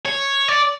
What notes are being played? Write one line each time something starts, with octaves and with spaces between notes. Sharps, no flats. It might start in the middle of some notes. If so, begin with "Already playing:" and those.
C#5
D5